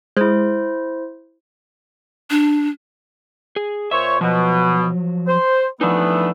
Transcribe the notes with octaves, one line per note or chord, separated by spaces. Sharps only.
G#3 E4 C5
D4
G#4
A#2 C5 C#5 E5
B2 F3 F#3
C5
E3 F3 A3 B3 D4 D#4